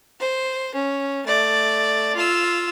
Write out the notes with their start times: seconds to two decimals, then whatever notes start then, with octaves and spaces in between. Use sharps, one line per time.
0.20 C5
0.74 C#4
1.26 A3 D5
2.15 F4 E6